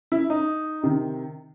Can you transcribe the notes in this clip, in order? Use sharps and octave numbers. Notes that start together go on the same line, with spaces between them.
E4
D#4
C3 D#3